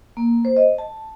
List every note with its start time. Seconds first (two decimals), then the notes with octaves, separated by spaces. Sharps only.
0.17 A#3
0.45 C5
0.57 D#5
0.78 A5